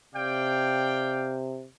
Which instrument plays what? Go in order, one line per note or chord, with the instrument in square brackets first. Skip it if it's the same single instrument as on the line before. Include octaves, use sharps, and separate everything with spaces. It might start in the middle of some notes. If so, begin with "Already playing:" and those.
[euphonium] C3 [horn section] D5 F5 G5